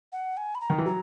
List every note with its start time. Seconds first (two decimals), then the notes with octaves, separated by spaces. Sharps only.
0.13 F#5
0.37 G#5
0.55 B5
0.61 A#5
0.70 D#3
0.78 E3
0.86 F#3 A#5